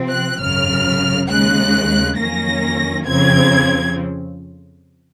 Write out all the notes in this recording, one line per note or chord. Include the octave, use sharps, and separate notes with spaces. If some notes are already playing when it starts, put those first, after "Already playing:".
Already playing: C3 F3 C4
F#6
G#1 F#2 C#3 F6
D#2 C#3 G#3 F#6
F2 D#3 F#3 A#3 C#4 A#6
F2 C#3 F3 C4 G#6